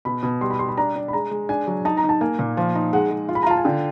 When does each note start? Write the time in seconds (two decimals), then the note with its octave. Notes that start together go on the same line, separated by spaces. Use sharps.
0.05 B2 B5
0.23 B2 B5
0.41 G3 C6
0.50 B5
0.59 G3 C6
0.69 B5
0.77 D4 A#5
0.96 D4
1.08 B5
1.13 G#3 A#5
1.31 G#3
1.49 D4 G#5
1.67 F#3
1.85 D#4 A5
1.97 A#5
2.04 D#4
2.09 A5
2.21 A#3 G#5
2.39 A#2
2.57 F3
2.75 D#4
2.93 G#3 F#5
3.11 G#3
3.29 F4
3.35 B5
3.43 A#5
3.47 F4 A5
3.57 G#5
3.65 D3 G5